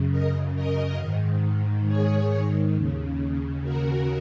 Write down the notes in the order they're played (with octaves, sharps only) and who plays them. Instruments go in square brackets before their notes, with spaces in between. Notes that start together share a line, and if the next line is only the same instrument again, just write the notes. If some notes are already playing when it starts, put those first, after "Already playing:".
Already playing: [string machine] F#2 C#3
A#4 D#5
A#4 D#5
G#2 D#3
G#4 C#5
D#2 C#3
F#4 A#4